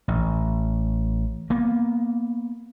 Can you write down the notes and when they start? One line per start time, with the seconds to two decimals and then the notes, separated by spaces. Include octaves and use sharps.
0.08 A1
1.50 A#3 B3